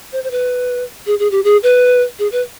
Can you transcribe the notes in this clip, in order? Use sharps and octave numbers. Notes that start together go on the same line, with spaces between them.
C5
C5
B4
G#4
G#4
G4
G#4
B4
G#4
B4